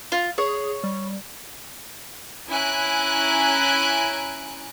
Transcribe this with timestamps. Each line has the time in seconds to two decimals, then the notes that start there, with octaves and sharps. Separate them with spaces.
0.12 F4
0.38 G#4 C#5
0.84 G3
2.48 C#4 E4 G#5 A#5 F#6 D7